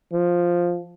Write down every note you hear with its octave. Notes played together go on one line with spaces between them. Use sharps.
F3